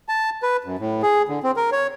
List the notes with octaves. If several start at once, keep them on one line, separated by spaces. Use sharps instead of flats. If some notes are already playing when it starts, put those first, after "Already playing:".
A5
B4
F#2
A2
G#4
D3
C4
A#4
C#5